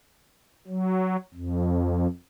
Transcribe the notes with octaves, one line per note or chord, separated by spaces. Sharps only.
F#3
F2